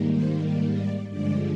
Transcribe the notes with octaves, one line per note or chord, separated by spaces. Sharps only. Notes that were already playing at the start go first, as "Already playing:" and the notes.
Already playing: G#2 D#3 G3 A#3
C5
D5
D5
G2 D3 F3 G#3 D5